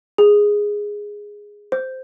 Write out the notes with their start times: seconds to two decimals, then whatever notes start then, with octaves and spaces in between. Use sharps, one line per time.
0.18 G#4
1.72 C5